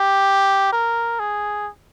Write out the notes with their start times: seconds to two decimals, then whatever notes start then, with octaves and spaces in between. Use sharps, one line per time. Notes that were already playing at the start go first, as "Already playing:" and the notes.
Already playing: G4
0.73 A#4
1.20 G#4